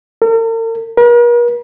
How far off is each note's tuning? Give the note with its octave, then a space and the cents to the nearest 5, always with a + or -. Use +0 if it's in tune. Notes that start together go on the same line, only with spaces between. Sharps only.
A#4 -45
A#4 +45